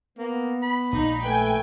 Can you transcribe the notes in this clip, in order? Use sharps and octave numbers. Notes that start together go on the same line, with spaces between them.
A#3 B3
B5
A#1 A#2 G#3 D#4
A3 B4 G5 G#5